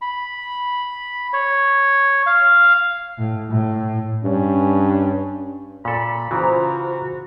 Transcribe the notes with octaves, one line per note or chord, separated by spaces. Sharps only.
B5
C#5
F5
A2
A2
G2 C#4
A#2 A4 B5
C#3 E3 F4 F#4 C5 A#5